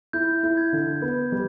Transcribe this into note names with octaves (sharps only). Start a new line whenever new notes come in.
E4 G6
E4
G#6
D3
B3
G3